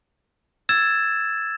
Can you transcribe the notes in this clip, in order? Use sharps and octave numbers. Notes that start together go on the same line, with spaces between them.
E6 G#6 A6 E7